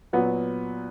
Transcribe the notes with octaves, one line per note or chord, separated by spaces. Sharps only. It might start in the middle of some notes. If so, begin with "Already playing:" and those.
A#2 F#3 B3